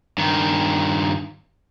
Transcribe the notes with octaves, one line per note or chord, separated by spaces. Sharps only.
G2 D#3